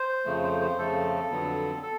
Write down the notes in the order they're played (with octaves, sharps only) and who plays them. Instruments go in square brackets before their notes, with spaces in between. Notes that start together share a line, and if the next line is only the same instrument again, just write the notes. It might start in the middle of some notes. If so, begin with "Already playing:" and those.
Already playing: [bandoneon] C5
F2 C#3 F3 A3
C5
C5
F2 C#3 F3 A3 A4
F2 D3 F#3 B3
A4